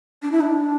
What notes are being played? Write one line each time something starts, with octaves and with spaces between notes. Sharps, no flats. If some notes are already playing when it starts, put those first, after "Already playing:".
D4
E4
D4